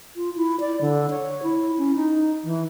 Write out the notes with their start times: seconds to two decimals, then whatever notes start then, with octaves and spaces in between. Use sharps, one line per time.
0.16 F4
0.36 E4
0.60 D5
0.81 D3
1.10 C#5
1.43 E4
1.78 C#4
1.95 D#4
2.44 E3